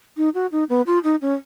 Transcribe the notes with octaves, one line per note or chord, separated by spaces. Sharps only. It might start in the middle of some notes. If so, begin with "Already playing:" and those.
D#4
F#4
D#4
B3
F4
D#4
C#4